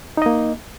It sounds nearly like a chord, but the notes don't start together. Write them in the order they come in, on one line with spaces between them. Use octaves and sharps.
D#4 D#5 A#3